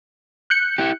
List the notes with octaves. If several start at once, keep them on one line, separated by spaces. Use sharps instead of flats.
F#6 G6 C#7
E4 G4